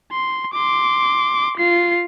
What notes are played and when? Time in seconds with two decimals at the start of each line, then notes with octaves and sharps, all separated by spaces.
0.12 C6
0.53 C6 D6
1.57 F4 C7